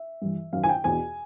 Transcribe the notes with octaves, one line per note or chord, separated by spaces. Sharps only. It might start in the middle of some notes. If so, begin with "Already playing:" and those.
Already playing: E5
G2 E3
F#2 D#3 F5
G#5
G5
E2 B2 G#5